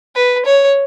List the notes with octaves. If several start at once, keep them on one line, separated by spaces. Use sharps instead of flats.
B4
C#5